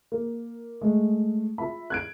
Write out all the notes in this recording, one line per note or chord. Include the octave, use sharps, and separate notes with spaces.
A#3
G#3 A3
F4 E5 B5
F#6 G#6 D7